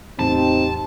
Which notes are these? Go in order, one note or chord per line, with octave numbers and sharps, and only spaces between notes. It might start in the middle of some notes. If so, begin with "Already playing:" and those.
E2 A2 C4 D#4 G4 A5